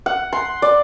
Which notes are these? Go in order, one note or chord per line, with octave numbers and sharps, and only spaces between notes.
F#5
C6
D5